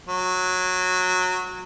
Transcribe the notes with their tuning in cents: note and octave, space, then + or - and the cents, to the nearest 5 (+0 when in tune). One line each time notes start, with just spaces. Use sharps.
F#3 -15